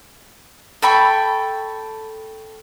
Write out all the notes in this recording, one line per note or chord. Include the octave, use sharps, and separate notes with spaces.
A4 G5 B5 C#6